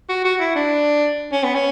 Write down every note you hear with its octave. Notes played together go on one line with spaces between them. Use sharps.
F#4
F#4
E4
D4
C#4
B3
C#4